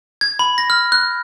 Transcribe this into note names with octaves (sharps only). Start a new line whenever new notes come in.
G#6
B5
A#6
F6
F#6